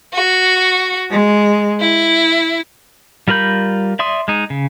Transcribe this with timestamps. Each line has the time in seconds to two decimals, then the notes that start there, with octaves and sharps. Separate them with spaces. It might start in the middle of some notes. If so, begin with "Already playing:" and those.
0.13 F#4
1.11 G#3
1.81 E4
3.28 G3 F4 A#4 B5 G6
3.99 D5 E5 C6 D#6
4.28 G#3 D#4
4.50 C#3